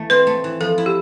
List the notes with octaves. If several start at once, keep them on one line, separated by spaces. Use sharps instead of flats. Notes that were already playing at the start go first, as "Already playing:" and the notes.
Already playing: E3 A3
C4 B4
A3
E3
F3 A4
E4
G4